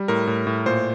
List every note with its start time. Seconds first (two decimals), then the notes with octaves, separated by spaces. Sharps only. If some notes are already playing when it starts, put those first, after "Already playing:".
Already playing: G3
0.08 A2 A#4
0.27 A2
0.47 A2
0.66 A#2 C5